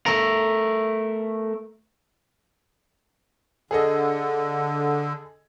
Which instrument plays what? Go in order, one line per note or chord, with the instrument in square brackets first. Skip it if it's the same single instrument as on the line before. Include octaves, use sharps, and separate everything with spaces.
[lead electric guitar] A3 A#4
[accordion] D3 [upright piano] G#4 A4 D#5